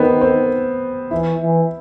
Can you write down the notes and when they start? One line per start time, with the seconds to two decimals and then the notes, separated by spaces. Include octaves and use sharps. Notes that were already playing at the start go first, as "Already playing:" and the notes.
Already playing: D#3 B3 C4
0.21 C4
1.11 E3 E4
1.41 E3